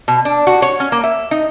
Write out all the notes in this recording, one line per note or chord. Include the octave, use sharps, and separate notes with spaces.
B2
D4
F#4
C#5
C#4
A#3
E5
D#4